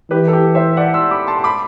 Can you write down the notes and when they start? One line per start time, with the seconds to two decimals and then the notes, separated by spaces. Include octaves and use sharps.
0.11 E3 G4 B4
0.28 A4
0.33 G4
0.55 C5 E5
0.77 D5 F#5
0.94 C6 E6
1.10 B5 D6
1.27 A5 C6
1.39 C6
1.44 B5 D6